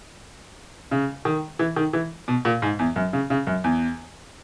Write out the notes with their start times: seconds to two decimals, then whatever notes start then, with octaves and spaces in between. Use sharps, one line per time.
0.91 C#3
1.25 D#3
1.59 E3
1.76 D#3
1.93 E3
2.28 B2
2.45 A#2
2.62 G#2
2.79 E2
2.96 F#2
3.13 C#3
3.30 C#3
3.47 F#2
3.64 E2